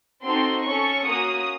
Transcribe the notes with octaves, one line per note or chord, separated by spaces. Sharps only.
C4 D#4 F#4 A4 C6
C#4 A4 C#6
A#3 C#4 F#4 D#6